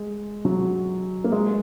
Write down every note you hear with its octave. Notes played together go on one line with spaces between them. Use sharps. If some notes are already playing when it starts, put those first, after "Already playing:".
Already playing: G#3
F#3
A#3
G#3